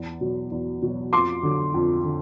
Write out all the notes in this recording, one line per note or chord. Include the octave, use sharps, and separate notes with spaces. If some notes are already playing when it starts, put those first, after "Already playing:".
Already playing: E2
B2 F#3
E2
B2 F#3
F2 C6 D6
D3 F#3
F2
D3